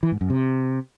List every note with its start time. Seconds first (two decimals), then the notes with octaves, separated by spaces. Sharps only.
0.03 E3
0.12 G#2
0.21 F#2
0.30 C3